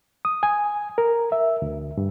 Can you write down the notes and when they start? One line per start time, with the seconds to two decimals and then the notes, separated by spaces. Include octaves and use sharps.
0.25 D#6
0.43 G#5
0.98 A#4
1.32 E5
1.62 D2
1.97 G2